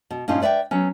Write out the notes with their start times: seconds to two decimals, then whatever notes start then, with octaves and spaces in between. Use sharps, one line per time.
0.10 B2
0.28 G2 A#2 C#4 D#4 F4
0.42 B4 D5 E5 F#5 G5
0.71 F#3 B3 C#4